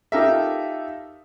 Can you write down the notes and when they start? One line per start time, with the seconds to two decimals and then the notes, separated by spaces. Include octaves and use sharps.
0.12 D#4 F4 G4 A4 A#4 E5